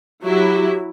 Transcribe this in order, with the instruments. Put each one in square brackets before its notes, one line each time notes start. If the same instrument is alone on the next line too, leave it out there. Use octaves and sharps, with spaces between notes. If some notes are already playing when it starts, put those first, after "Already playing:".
[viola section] F#3 E4 [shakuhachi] G4